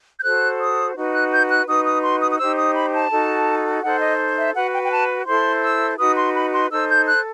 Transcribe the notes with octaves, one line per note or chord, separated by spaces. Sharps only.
G6
F#4 A4 C5 F#6
D#6
D#4 F#4 B4
F#6
G6
F#6
D#4 F#4 B4 D#6
D#6
C6
D#6
D#6
D#4 G4 C5 E6
D#6
B5
A5
D#4 F#4 A4
D#4 A4 C5 F#5
D#5
E5
F#4 B4 F#5
G5
G5
A5
E4 A4 C5 C6
E6
D#4 F#4 B4 D#6
C6
B5
C6
D#4 A4 C5 E6
G6
F#6